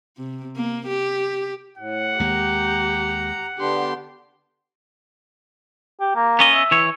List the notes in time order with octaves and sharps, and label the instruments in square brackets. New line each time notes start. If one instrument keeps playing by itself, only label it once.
[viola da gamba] C3
A#3
G4
[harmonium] A2 [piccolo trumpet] F#5
[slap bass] D#2 G#3 A#3 [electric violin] G4 [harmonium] A#5
[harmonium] D3 B3 D4 [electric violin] G4 C6
[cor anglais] G4
A#3
[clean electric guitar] B3 C#4 D#5
[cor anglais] E5
[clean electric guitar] E3 C#5